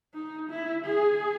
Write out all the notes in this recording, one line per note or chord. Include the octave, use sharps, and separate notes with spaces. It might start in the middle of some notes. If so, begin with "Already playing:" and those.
D#4
E4
G#4